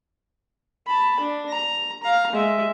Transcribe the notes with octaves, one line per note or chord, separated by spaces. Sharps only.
A5 B5
D4
A#5
F5 A#5
G#3 E5